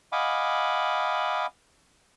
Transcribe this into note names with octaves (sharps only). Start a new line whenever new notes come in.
D#5 F5 F#5 G#5 B5 D6